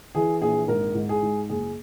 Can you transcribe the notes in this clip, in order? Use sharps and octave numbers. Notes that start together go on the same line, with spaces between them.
E3 G#4
A#1 G#4
G#1 A#4
G#2
G#4
G#2
F#1 G#4